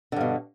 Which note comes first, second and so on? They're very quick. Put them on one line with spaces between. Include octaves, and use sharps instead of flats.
D3 G2 B2